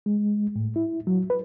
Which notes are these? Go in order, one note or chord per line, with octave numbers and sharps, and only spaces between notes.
G#3
A2
E4
F#3
B4